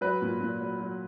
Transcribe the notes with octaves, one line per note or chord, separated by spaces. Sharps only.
F#3 B4
A#2
A#2
F#3
F#3